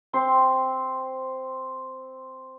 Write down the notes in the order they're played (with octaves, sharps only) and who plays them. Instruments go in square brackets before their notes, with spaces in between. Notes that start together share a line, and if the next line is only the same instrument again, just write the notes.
[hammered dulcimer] C4 C6